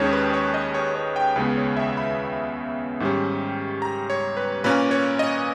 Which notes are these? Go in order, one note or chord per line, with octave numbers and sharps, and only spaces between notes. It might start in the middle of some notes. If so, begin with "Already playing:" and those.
Already playing: D#2 D#3 G#3 C#4 C#5
B4
C#5
D#5
C#5
C#5
G5
C#2 C#3 G#3 B3 B4
C#5
E5
B5
G#2 D#3 G3 C#4
A#5
C#5
B4
A#2 A#3 C#4 B4
C#5
D#5